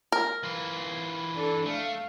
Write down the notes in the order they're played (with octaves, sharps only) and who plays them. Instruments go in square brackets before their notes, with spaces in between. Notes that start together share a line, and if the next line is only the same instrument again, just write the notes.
[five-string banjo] A#4
[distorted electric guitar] E3 F4
[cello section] D4 A4
[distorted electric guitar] A3 [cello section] F5